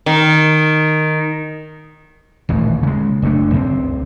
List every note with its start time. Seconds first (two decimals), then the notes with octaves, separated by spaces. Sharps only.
0.06 D#3
2.49 D#1 A1 D#2
2.83 C#3 G#3
3.22 F#1 A3 D4
3.54 C#2 C4